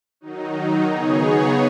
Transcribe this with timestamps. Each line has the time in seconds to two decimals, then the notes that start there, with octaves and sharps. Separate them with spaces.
0.21 D#3 F#3 D#4
0.86 C#3 B3 D#4 G#4 C#5